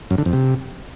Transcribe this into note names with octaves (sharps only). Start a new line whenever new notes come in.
F#2
D3
F2
C3